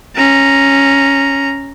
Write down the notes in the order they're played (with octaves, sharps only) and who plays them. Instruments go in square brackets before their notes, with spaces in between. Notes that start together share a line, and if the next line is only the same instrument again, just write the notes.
[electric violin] C#4 A#5